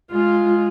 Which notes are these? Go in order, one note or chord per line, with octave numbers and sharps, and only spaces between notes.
G#3 F4